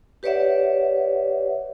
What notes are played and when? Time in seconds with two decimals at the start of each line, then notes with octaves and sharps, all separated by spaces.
0.23 G4 B4 C#5 D5 E5 F#5